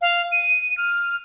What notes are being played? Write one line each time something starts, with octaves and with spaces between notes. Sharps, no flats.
F5
D#7
F6